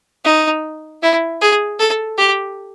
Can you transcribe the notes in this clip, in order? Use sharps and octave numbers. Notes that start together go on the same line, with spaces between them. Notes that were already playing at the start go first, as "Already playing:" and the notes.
D#4
E4
G#4
A4
G4